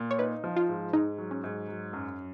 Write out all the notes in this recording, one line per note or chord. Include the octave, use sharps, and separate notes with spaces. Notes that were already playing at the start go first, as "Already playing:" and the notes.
Already playing: A#2
C#5
D#4 B4
F3
F4
G#2
G#2 D#4
F#3
C#4
G#2
F#3
F#2